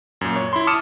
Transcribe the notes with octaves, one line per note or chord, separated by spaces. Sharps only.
F#2 A#2
C#5
E4 B5 C6
A5 D6 D#6 F6 C#7 E7